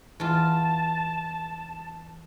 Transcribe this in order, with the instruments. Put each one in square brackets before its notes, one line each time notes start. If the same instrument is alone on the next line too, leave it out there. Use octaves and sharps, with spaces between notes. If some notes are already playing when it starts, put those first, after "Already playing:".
[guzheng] E2 F4 [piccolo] A5